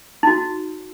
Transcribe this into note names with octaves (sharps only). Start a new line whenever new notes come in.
D#4 F#4